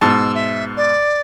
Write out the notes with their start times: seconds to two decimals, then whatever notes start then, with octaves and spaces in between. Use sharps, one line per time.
0.01 G#2 B2 A5 E6
0.35 E5
0.77 D5